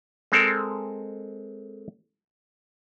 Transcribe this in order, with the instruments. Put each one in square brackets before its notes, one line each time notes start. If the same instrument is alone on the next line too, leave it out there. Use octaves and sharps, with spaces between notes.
[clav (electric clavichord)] G#3 C4 A4 A#4